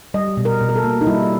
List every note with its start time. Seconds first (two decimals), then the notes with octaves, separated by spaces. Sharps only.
0.14 G3 D#5
0.37 B2
0.45 A#4
0.61 B2
0.69 A#4
0.76 A4
0.84 A#3
1.01 D#4
1.07 G3 E4